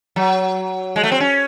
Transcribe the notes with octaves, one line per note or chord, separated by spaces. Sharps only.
F#3
G#3
A3
C4
C#4